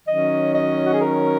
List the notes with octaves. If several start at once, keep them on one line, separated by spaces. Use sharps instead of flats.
D#3 F#3 C#4 D#5
D#5
F#4
G#4
A#4